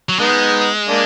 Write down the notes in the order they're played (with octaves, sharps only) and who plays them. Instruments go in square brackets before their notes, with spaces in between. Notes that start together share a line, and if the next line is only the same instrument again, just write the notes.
[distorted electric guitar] F#3
[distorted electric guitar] G#3 [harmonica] B3 D#4
[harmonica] A#3 D4